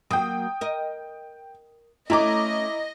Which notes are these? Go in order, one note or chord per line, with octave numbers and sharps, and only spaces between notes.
F#3 A#3 G5 D#6
A#4 D#5
A3 C#4 E4 D#5 A#5 D6